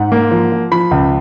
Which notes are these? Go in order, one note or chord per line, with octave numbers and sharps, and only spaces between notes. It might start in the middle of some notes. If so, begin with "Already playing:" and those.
Already playing: G#2 F#5
A#3
F3
F3
F3 B5
C#2